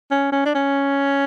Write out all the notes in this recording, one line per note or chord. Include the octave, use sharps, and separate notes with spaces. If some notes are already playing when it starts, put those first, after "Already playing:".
C#4
C#4
D4
C#4